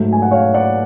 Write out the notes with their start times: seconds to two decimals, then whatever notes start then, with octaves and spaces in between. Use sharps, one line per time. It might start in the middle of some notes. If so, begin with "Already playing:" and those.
Already playing: G#2 F#3 A3
0.13 G#5
0.22 F#5
0.31 C#5 F5
0.54 D5 F#5